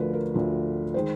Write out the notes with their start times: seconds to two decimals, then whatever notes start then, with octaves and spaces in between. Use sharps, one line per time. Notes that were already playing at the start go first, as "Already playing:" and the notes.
Already playing: D2 D3 F3 A#4 B4
0.13 A#4
0.34 D2 D3 F3
0.94 D#3 G#3 C5